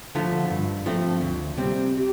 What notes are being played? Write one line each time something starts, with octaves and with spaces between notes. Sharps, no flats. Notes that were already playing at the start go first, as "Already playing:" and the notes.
D3 F3 A3
G2
F3 A3 C4
D2
C3 G3 C4
G4